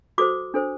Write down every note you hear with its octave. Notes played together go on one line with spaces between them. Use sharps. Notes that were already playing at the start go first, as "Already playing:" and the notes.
F#4 A4 C5 D6
D4 A4 C5